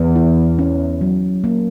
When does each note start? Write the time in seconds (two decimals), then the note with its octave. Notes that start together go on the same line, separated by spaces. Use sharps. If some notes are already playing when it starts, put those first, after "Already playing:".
Already playing: E2 B3
0.16 E4
0.58 C#4
1.01 F#3
1.44 A#3